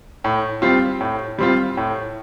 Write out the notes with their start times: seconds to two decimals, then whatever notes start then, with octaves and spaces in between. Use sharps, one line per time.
0.24 A2
0.62 G3 C4 F4
1.01 A2
1.39 G3 C4 F4
1.77 A2